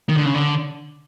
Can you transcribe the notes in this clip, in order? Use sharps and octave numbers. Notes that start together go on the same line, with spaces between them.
D#3
D3
C#3
D3